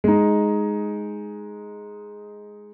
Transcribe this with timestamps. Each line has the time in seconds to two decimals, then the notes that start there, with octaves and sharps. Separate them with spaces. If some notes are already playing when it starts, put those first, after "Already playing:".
0.04 G#3 D#4